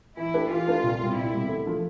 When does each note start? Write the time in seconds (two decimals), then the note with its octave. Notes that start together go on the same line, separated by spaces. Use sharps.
0.17 E3 E4
0.34 A3 D4 G4 B4
0.50 E3 F4
0.67 A3 D4 G4 B4
0.83 C2
0.99 B2 G3 C4
1.15 C2 E4
1.33 B2 G3 C4
1.48 D2
1.65 D3 F3 A3